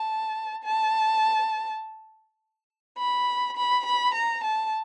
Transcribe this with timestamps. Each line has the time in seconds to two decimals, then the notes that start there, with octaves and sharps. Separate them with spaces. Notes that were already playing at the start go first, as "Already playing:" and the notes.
Already playing: A5
0.64 A5
2.98 B5
3.56 B5
3.86 B5
4.14 A#5
4.44 A5